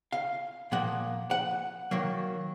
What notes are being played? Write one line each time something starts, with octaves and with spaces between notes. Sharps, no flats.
F5
A#2 F3 A#3 F#5
F#5
D#3 F#3 A#3